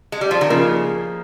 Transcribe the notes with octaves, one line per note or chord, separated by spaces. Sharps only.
G#3
G3
F3
D#3
C#3 F3 A#3 D#4 G#4